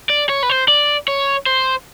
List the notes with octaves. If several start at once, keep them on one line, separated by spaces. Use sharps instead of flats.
D5
C#5
B4
C5
D5
C#5
C5